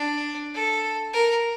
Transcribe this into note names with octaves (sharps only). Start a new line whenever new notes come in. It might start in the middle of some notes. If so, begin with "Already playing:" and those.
Already playing: D4
A4
A#4